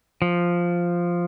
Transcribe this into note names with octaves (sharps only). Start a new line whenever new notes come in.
F3